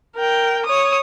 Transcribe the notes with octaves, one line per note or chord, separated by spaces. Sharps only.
A#4 G5
C#5 D#6